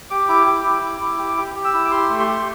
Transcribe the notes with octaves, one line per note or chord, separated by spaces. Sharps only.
G4 D6
E4 D6
G4
E4
E4
E4
G4
G4
G4
E6
E4
D6
G4 C6
A3
C6
G4